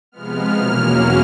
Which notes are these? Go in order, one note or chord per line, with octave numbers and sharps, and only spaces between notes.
C3 F3 G#3 B3 F6
E2 B2 F#3 A#3 C#4